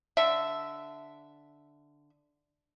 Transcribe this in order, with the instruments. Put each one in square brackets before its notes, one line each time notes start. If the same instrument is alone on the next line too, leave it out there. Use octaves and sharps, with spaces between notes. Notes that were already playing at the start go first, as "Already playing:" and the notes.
[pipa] D3 E5